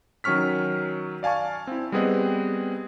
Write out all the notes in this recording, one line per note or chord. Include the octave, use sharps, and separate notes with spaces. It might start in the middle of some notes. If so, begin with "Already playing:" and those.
D#3 F#3 C#4 C#6 F6 B6
D5 F5 G#5 A5 C#6
C4 E4
G3 B3 C4 G#4 B4 D#5